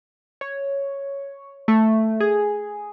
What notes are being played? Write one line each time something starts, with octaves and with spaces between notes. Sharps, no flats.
C#5
A3
G#4